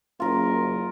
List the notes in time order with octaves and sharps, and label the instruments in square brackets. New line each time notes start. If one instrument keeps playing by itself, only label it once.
[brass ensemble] F#1 [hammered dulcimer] F4 A#4